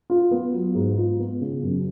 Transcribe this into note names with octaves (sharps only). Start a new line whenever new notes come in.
F4
B3
F#3
G#2
F4
B3
C#3
F#2